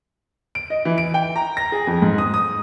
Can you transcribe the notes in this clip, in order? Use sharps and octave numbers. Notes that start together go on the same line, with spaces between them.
D7
D#5
E3
D7
G5
A#5
A#6
G#4
F2
G#2
D#6
D#6